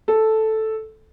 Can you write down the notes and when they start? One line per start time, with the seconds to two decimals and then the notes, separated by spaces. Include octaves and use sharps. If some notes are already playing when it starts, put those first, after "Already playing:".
0.08 A4